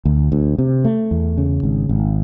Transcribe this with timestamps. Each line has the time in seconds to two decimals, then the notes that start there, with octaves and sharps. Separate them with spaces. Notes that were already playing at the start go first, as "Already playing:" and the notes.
0.05 D2
0.32 D2
0.58 C3
0.85 A3
1.11 E2
1.38 C#3
1.63 G#1
1.89 G#1